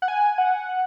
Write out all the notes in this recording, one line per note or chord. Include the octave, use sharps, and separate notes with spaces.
F#5
G#5
F#5